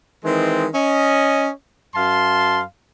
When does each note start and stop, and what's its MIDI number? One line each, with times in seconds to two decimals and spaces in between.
0.25 0.67 51
0.25 0.67 52
0.25 0.67 56
0.25 0.67 60
0.74 1.50 61
0.74 1.50 75
1.95 2.62 42
1.95 2.62 77
1.95 2.62 81
1.95 2.62 84